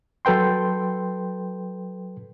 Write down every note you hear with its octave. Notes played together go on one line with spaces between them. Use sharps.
F#3 A4 B4 G5 C6